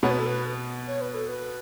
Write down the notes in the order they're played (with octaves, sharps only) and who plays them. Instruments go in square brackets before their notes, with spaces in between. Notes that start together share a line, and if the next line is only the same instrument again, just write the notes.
[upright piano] B2 B3 [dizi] C#5
[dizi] B4
A4
B4
C#5
B4
A4
B4